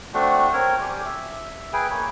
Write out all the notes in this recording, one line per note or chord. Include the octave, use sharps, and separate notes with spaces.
A3 C4 D4 F#4
C4 A#4 C#5
G4 D5 G#5
E5
G#4 B4 G5 G#5
A#3 C#5